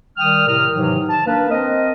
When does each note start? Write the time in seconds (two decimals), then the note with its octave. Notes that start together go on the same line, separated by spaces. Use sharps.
0.17 D#3 G3 G5 D#6 F6
0.47 A2 C3 A#4 D#6 F6
0.73 G#2 C3 D#3 E3 F#3
1.09 A5
1.26 A#3 D4 A#4 B4
1.50 C4 A#4 C5 D#5